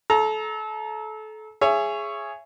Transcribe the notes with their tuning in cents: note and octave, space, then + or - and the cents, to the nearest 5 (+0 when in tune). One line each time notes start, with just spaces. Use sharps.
A4 -30 A#5 +0
G#4 +0 C#5 +0 E5 +30